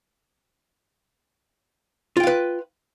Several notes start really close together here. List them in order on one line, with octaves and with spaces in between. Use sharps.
F4 G5 F5 B4